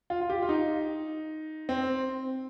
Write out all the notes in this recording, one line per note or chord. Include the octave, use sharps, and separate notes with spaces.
F4
F4
G4
F4
D#4
C4